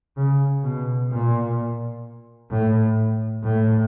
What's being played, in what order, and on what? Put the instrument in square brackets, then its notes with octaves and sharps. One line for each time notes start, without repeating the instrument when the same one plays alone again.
[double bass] C#3
B2
A#2
A2
A2